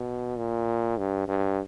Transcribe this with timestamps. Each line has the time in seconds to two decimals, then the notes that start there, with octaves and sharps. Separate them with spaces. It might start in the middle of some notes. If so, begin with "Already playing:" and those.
Already playing: B2
0.37 A#2
0.98 G2
1.28 G2